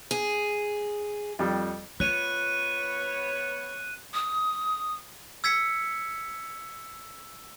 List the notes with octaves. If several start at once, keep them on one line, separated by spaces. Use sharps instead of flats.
G#4
F2 G3
B3 F4 B4 C#5 F#6 D#7
D#6
E6 G#6 B6 C#7